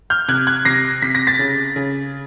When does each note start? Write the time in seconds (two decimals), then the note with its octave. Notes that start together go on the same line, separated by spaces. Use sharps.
0.10 F6 G6
0.28 C3 F#6 G#6
0.47 F#6 G#6
0.65 C3 A#6 C7
1.02 C3 B6
1.15 A#6
1.27 A6 B6
1.39 C#3
1.76 C#3